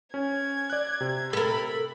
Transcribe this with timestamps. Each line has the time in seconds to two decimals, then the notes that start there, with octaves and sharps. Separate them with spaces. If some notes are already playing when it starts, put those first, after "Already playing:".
0.14 C#4 G#6
0.70 D5 F#6
1.01 C3
1.33 A4 A#4 B5